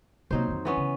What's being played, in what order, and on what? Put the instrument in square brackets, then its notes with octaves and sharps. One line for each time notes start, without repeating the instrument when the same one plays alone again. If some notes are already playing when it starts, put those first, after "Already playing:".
[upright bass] C3 A#3 [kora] F#3 D#4 C5
[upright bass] F2 D#3
[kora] E3 B3 C#4
[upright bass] C#3